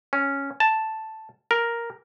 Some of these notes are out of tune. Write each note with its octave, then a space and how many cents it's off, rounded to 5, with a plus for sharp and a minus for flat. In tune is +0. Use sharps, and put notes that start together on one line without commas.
C#4 +0
A5 +0
A#4 +5